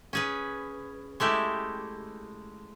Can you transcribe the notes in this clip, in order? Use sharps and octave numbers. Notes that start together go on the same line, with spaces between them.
C#4 G#4 B4
G#3 A3 E4 G4